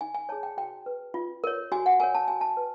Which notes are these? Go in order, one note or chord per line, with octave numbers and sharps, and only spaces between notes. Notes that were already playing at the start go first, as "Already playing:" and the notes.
D#4 G#5
G#5
G#4 C#5 A5
G5
F#4 G5
B4
F4
A#4 C#5
F#4 G#5
F#5
A#4 C#5 G#5
A5
F#4 G#5
A5
B4